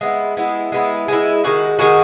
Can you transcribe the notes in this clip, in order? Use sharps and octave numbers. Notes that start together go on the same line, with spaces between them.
G#3 B3 E4
G#3 B3 E4
G#3 B3 E4
G#3 B3 E4
D#3 G#3 D#4 F#4
D#3 G#3 D#4 F#4